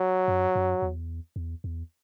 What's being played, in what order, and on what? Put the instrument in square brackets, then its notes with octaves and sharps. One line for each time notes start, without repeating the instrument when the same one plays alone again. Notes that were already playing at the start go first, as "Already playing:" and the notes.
Already playing: [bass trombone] F#3
[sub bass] F#2
F#2
E2
E2
E2